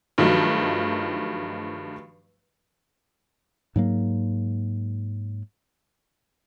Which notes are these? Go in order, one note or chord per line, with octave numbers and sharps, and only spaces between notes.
G2 D#3 F3 F#3 A3
G#2 F#3 A#3